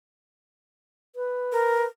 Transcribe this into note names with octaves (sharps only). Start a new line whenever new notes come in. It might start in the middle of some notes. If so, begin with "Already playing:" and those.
B4
A#4